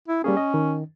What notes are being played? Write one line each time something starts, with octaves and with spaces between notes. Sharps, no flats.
E4
G3 A#3 C#4 G#4
D#5
D#3